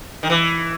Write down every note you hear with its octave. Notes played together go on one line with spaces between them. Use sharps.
D#3
E3